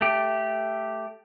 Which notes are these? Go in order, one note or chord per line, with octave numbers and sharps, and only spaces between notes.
A3 G4